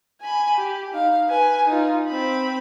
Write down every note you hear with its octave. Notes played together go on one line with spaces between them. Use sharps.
G#5 B5
G4
D#4 F5
B4 G#5
D#4 F4
C4 B5